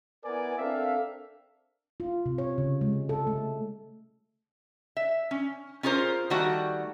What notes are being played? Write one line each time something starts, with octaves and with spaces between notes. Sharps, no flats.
B3 E4 A#4 B4 D5 G#5
C4 D4 A4 A#4 E5 F5
F4
C3
C#5
C#3
G#3
A4
A3
E5
C#4
C#4 F4 G#4 A#4 C5
D#3 G3 A3 F#4 F#5